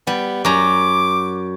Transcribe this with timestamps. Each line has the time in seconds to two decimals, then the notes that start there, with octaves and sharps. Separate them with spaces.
0.07 G3 B3
0.45 F#2 A#5 D6